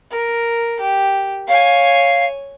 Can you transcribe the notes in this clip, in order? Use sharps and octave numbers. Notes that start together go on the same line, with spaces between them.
A#4
G4
C#5 F5 G#5